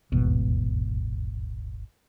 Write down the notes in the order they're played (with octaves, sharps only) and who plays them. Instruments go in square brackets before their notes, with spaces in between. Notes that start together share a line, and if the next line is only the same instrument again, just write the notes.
[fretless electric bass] D#1 G#1 E2 B2